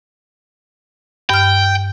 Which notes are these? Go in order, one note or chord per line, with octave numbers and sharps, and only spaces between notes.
G2 G5 F6